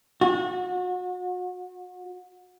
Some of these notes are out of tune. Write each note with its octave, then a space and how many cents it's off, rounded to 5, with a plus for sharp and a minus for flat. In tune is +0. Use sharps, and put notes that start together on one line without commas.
F#4 -35